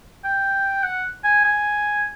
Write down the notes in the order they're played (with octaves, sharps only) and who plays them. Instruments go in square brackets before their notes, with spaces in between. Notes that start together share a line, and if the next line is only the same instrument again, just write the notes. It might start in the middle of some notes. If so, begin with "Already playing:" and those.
[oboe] G5
F#5
G#5
G#5